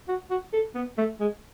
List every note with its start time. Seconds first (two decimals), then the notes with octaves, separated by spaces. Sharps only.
0.08 F#4
0.30 F#4
0.53 A4
0.75 B3
0.98 A3
1.20 G#3